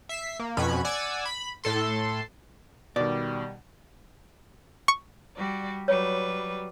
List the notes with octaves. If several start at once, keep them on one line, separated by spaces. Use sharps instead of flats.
E5 B6 C7
A#3
F2 B2 C#4 B5 F#6 G#6
D5 F#5 G#5 D6 E6 G#6
B5
A2 A4 C6
B2 D#3 G3 D5
C#6
G3 F#4 D5
F#3 G3 B4 C#5